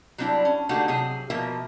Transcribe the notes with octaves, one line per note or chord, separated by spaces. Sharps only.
F#3 G3 C4 D4 E4
C#4
D3 A3 A#3 D#4 F#4 G4
C3 F#3 G#4
B2 F3 A#3 A#4 E5